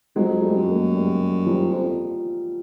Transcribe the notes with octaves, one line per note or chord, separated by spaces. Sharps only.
F2 F#3 G#3
G3 A3
F#2
G#3 A#3
G3 A3
F3 G3
F2